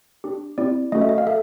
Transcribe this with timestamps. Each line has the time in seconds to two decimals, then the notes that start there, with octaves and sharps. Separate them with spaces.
0.24 D4 G4
0.58 C4 E4 G4 D5
0.92 A3 C#4 F#4 A4 D#5
1.01 E5
1.09 D#5
1.18 F5
1.27 A4 E5